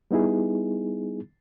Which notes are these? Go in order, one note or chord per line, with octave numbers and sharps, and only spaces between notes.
G3 B3 D#4 E4 G#4